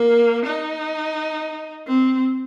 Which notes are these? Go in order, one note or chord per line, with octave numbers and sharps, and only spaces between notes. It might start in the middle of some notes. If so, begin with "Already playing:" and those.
Already playing: A#3
D#4
C4